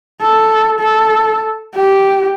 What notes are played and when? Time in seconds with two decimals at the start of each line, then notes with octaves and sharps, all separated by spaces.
0.22 A4
0.79 A4
1.75 G4